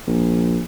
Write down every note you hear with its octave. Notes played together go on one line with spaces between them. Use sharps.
A#1